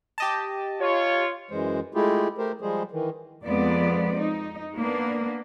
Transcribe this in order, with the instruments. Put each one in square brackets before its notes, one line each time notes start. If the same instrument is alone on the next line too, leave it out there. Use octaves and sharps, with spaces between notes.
[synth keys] G4 D#5 A5
[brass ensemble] F4 C#5
[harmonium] F#2 E3 G#3 C5
G#3 A3 E4 F4 G4 G#4
A3 G4 A#4 C5
F3 G3 G#3 G#4 C5
D#3 E3
[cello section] F2 F3 G#3 A#3 B3 D5
D#4
A#3 B3 D4